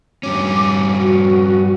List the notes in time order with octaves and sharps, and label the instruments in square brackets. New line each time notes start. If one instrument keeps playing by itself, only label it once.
[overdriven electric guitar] G2 C#4 [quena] D6
[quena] F#4